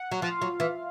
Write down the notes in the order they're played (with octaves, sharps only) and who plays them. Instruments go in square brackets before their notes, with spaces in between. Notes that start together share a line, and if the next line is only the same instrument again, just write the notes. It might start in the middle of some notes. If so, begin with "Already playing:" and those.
Already playing: [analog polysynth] F#5
[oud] F#3
[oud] F3 [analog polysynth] F4 F5
[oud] F#3
E3